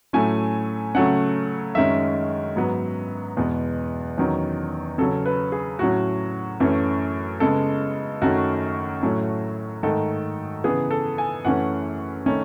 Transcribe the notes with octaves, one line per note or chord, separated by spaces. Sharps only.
A2 F#3 A3 C#4 G#5
C#3 F#3 A3 C#4 F#5
F#2 D#3 G#3 C#4 E5
G#2 F#3 B3
E2 B2 G#3 B3
E2 D#3 F#3 C#4
C#3 F#3 C#4 A4
B4
G#4
A2 F#3 C#4 F#4
F#2 E3 A3 C#4
C#3 G#3 B3 A4
F#2 D#3 A3 C#4 F#4
A2 F#3 A3 C#4
G#2 D#3 A3 A4
C#3 E3 B3 G#4
A4
G#5
F#2 E3 A3 C#4 F#5
D#3 A3 C#4